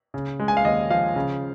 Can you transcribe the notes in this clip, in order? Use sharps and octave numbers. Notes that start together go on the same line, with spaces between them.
C#3
G#3
G#5
F5
D#2 D#5
F3 F5
C#3